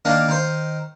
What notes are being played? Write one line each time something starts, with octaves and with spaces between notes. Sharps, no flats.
D#3 A#3 D4
D#3 C5